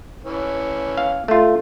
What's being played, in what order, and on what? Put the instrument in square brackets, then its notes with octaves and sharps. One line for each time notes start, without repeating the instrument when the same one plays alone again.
[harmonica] E3 C#4
[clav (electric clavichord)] F5
A3 F4